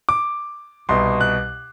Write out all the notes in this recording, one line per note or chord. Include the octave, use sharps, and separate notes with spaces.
D6
C2 B2 C6
F#6